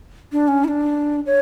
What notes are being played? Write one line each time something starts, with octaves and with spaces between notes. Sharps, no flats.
D4
C#4
E4
D4
C#5